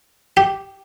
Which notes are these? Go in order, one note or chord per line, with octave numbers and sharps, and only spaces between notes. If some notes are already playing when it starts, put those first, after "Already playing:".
G4